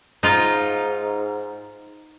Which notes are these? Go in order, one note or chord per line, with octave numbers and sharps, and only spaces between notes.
G#2 D#4 F4